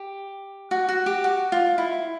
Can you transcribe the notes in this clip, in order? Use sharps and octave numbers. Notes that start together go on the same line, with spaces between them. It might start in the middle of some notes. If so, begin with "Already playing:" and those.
Already playing: G4
F#4
F#4
G4
F#4
F4
E4